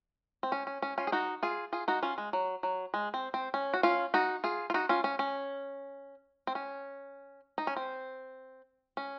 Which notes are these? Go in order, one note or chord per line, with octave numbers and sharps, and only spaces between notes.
C4
C#4
C#4
C#4
C#4 F4
G#4
D#4 F#4
F4 G#4
F4 G#4
D#4 F#4
C#4 F4
G#3
F#3
F#3
G#3
C4
C4
C#4
F#4
C#4 F4
D#4 F#4
F4 G#4
F4
D#4 F#4
C#4 F4
C#4
C#4
C4
C#4
D#4
C#4
C4
C#4